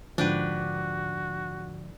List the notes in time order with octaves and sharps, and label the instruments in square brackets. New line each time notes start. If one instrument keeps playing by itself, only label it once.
[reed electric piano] G#2 D3 F3 [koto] D4 G4 B4 [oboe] F#4